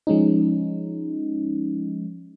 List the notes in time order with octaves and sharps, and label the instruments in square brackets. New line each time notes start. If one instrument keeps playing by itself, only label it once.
[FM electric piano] F3 G#3 C#4 D#4